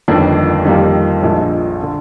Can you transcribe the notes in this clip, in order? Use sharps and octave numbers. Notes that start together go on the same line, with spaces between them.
G1 F2 D#3 A#3 D4
F2 D#3 G3 A#3 F4
A#1 A#2 G#3 D4
D3